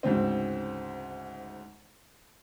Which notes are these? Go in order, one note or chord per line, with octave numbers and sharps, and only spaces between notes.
D2 G#2 C#3 C4